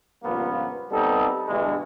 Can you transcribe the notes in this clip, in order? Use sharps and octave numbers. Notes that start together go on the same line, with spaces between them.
C#2 G2 A#2 F3 A#3 B3
G3 B3 C4 D#4 A4
G2 B2 D3 E3 G#3 A3